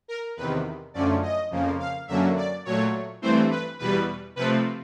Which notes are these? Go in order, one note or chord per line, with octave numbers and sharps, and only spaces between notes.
A#4
E2 C3 D#3 B4
F#2 D3 F3 A3 C#4 D5
D#5
F2 C#3 F3 A#3
F5
F#2 D3 F#3 A#3 C#4 E5
D5
A#2 F#3 A3 C#5
G2 E3 A3 C4 C5
B4
E2 B2 G3 B4
C3 F3 A3 C4 B4